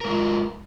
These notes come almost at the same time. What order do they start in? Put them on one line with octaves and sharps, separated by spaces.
A#4 G#3 F4